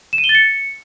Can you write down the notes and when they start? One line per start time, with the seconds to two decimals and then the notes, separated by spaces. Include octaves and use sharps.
0.13 E7
0.18 D#7
0.24 G7
0.29 A6
0.35 C#7